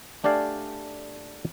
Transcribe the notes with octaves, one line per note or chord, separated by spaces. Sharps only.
A3 D4 G4 D5 F5 G#5